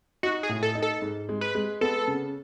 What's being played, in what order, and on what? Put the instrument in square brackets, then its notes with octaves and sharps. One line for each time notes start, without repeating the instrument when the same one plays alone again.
[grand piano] D#4 [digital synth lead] F#4
[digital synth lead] G#4
[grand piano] A2
[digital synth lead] A4
[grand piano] D#4
[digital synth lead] A4
[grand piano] G#2
G#3
[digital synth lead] B4
[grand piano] G#3
[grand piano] B3 [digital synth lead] A4
[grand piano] C#3